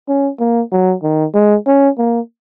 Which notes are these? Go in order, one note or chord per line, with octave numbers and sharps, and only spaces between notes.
C#4
A#3
F#3
D#3
G#3
C#4
A#3